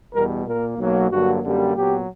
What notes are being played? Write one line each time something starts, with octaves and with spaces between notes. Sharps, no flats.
E2 B2 G3 A#4
A#2 A#3 A#4
B1 B2 F#3 A#3
G2 D3 F#3 A#3 F#4
F#2 D3 G3 A#3
A#2 F#3 B3 G4